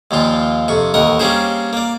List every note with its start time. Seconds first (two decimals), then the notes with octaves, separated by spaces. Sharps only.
0.11 D#2 A#2 F3 F4
0.68 F2 C3 C#6
0.94 A1 D#2 A#4 D#5 F#5
1.20 G3 A#3 C4 C#4 G#4 C5
1.73 A#3 D5